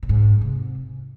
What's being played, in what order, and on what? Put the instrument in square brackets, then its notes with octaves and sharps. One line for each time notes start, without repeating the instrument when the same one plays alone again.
[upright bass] A#2
G#2
C3